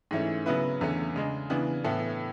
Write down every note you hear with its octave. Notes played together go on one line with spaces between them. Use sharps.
G#2 E3 A3 C#4
C#3 F#3 B3 E4 B4
E2 D3 A3 C#4
C#3 G#3 D4
C#3 E3 B3 D4
A2 E3 B3 E4 A4